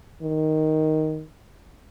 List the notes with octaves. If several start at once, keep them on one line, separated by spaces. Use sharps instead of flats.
D#3